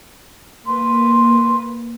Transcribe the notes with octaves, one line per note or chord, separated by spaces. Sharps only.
A#3 B4 C6